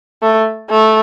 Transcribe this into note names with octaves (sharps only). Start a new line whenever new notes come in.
A3
A3